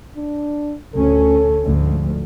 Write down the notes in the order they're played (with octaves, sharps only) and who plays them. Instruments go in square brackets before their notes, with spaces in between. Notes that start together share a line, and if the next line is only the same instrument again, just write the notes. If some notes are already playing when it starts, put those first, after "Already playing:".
[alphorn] D4
[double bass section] D2 C#4 [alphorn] A4
[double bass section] D2 G#2 F3